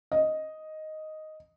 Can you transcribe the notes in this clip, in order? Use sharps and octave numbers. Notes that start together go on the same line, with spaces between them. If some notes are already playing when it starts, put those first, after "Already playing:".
D#5